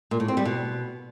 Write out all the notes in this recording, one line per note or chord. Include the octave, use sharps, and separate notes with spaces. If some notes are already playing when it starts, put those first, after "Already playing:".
A#2
A2
C4
G3
B2